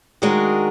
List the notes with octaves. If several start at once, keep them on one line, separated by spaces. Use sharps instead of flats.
D#3 G#3 D4 F#4 A#4